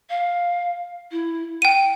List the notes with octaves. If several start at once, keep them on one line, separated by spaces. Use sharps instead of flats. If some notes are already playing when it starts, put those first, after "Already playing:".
F5
E4
F#5 G5 D#7